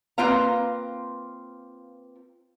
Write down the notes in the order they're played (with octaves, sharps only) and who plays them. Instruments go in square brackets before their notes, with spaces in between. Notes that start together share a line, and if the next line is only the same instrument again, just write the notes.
[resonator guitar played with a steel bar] A#3 C4 F4 B4 F5 A#5